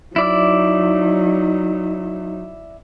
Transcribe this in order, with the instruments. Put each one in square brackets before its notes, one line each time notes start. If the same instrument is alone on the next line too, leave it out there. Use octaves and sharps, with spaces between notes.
[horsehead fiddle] F#3 D#4 [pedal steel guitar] E4 D5 E6